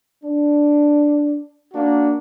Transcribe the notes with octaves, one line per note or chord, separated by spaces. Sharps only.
D4
A#3 D4 F#4